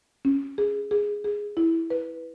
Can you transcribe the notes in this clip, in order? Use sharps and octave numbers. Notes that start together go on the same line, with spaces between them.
C#4
G#4
G#4
G#4
E4
B4